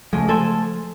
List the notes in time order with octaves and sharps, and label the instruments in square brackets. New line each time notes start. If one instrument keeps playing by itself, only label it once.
[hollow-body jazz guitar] C#2 G#3 [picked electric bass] F3 A3
[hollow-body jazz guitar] A4 C5 G#5